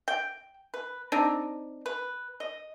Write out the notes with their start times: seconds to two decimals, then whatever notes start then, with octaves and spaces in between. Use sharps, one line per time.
0.08 G5
0.74 B4
1.12 C4 D4 D#4
1.86 B4
2.40 D#5